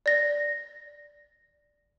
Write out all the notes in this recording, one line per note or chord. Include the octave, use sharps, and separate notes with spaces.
D5 A#6